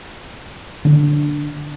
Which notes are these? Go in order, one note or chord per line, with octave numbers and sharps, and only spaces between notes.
D3 C4 D4